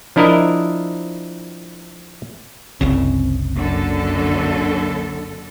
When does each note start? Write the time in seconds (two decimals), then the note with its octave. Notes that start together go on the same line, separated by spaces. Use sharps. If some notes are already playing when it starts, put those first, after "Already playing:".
0.16 F3 D4 E4 A#4 D#5 E5
2.81 F#1 C2 C#3 C4
3.56 F#2 D3 A#3 A4